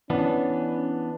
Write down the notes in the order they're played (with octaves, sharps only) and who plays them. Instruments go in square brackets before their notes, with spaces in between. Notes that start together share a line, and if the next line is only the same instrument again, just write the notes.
[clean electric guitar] E3 B3 D4 [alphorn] C#4